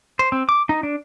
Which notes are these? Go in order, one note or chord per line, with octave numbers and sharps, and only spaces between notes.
C5
C4
D6
D#4
D4